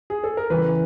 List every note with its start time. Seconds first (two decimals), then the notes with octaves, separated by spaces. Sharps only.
0.10 G#4
0.24 A4
0.37 A#4
0.50 E2 C#3 E3 G3 B4